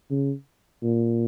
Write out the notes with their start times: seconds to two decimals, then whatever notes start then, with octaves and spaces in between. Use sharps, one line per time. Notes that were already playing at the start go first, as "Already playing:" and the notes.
0.11 C#3
0.83 A#2